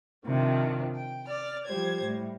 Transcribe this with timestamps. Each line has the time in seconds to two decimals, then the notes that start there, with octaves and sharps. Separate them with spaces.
0.25 C3 D#3 F3 D4
0.94 G5
1.27 D5 F6
1.66 F3 G3 G4 C5 G#6
2.05 A2 G3